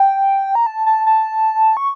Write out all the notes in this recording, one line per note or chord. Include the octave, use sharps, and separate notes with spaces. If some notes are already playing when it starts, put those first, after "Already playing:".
Already playing: G5
A#5
A5
A5
A5
C#6